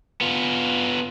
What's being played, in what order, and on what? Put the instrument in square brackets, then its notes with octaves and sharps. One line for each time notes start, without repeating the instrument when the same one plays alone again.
[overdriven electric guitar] B3 F4